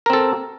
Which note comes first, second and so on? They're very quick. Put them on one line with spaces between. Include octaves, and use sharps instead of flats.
A#4 C4 A4